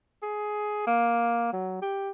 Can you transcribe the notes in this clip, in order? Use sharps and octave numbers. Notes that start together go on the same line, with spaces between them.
G#4
A#3
F#3
G4